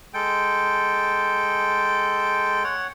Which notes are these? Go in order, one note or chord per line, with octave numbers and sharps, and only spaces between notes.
G#3 A4 G5
C#5 F#5